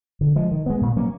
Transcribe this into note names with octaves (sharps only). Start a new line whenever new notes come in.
D3
F3 G#3
D#3
G#3 B3
A#2
F#3 A#3 C#4